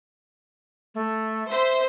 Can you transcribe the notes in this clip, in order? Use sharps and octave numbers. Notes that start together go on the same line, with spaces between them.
A3
C5 E5